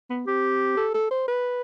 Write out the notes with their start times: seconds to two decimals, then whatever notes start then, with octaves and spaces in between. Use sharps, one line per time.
0.10 B3
0.27 C4 G4
0.77 A4
0.94 A4
1.11 C5
1.28 B4